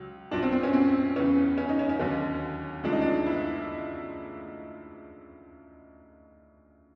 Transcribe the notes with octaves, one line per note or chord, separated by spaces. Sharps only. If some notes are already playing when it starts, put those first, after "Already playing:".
Already playing: C#2 F#3
A#1 A#2 F#3 D4
C4
C4
C#4
C4
E2 C#3 E3 C#4
C#4
D#4
C#4
C#4
D#2 D3 F#3
D2 C#3 F3 G#3 D4
D#4
D4
E4